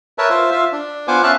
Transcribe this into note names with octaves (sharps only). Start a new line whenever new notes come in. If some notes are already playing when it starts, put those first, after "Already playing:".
A#4 B4 C#5 E5 A5
F4 C5 E5
F4 E5
D4
B3 F4 C5 F#5 G#5 D6
C#4 E5 F5 A5 F#6